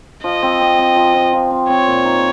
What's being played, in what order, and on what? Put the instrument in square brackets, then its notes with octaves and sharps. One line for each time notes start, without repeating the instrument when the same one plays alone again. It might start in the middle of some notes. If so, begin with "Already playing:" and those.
[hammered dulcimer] F3 [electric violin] D#5
[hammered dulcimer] C4
C4
C4
F3
F3
F3
C4
[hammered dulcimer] C4 [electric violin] C#5
[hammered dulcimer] A#2
D#4